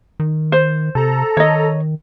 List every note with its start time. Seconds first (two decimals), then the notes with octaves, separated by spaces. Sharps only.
0.20 D#3
0.52 C5
0.95 C3 A4 A#5
1.37 D#3 C#5 D#5